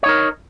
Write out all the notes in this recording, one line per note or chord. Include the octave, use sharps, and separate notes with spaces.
D#4 A#4 C#5